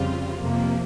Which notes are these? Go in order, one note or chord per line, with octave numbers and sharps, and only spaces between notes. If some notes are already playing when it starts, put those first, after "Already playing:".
Already playing: F2 C#3 G3 C4 F4
F2 C3 F3 A#3